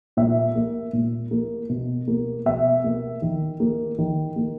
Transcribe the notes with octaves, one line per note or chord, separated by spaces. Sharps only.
A#2 E5
A#3
A#2
A#3
B2
A#3
B2 E5
A#3
D#3
A#3
D#3
A#3